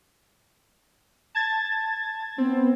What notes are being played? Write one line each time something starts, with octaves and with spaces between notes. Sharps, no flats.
A5 G#6 A6
B3 C4